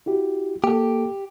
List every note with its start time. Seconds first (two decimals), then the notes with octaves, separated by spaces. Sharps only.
0.06 E4 F#4 G4
0.64 A#3 G4 A4